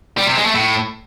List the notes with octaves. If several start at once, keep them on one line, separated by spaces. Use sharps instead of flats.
G3
C3
G#3
A3
A2